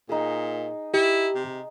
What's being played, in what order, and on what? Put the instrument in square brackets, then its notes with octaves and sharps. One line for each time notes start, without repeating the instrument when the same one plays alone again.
[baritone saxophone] A#2 [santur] D#4 G#4
[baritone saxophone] E4 [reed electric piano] G4
[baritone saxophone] C3